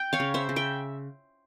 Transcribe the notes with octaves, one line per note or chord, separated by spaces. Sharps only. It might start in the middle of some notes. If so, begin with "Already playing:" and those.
Already playing: G5
C#5 F5
C#3
C5 E5
C#3
E5 G5